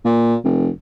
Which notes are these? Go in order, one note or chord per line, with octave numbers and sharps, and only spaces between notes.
A#2
F1